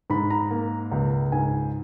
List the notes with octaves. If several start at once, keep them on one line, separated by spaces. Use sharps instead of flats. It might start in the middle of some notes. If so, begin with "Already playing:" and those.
G#2 B5
A#5
A#3
C#2
G#2 G#5